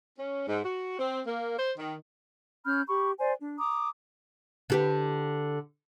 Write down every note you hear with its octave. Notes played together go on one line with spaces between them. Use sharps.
C#4
G#2
F#4
C4
A#3
C5
D#3
C#4 B5 F6 G6
G4 B5 C#6
C5 D5 G#5
D4
A#5 D6 D#6
D3 G4 B4